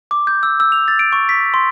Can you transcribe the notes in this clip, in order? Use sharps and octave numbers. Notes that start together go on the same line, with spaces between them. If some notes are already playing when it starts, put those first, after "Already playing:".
D6
G6
E6
E6
F7
A6
D7
C#6
B6
C6